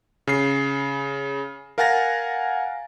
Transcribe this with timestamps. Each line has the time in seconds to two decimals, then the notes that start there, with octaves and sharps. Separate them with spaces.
0.27 C#3 C7
1.78 A#4 F5 F#5 G#5 A6 A#6